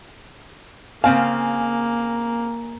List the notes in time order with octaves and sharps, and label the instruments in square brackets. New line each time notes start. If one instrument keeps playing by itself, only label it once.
[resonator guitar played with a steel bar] C#3 C4 F5 [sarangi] A#3 [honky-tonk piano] G#5